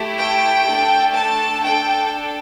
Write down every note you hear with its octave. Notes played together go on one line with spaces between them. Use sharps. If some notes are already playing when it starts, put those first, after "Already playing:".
Already playing: A3 E4 G4
G5
A3 D4 A4
A5
D4 A4 G5